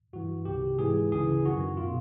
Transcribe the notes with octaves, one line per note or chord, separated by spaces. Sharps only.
G2 E3 F#4
C2 C3 D#3 G4
G#2 E3 G#4
D2 C#3 E3 G#4
F#2 D#3 F#4
B2 F4